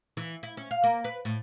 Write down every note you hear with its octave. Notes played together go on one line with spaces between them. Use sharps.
E3
E4
C#4
F5
A#3
B4
A2